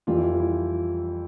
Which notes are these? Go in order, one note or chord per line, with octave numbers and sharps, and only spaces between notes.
F2 E3 G3 F4
E4
F4
F4
E4